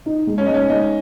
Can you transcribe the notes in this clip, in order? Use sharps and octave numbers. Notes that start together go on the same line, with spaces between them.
D#4
G#3
C#4
G#3 D#4
C#4
G#3 D#4